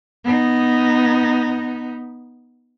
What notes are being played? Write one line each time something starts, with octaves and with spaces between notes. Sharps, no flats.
B3 D#4